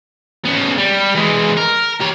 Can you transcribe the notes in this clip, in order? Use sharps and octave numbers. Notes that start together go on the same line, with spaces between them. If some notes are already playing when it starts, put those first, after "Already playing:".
C#3 B3
G3
E3 G#3
A#4
G4 C#5